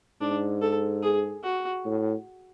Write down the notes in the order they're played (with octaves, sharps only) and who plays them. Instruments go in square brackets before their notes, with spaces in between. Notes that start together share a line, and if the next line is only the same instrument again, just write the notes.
[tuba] G#2 [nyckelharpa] D4
[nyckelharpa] A4
G#4
F#4
[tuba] A2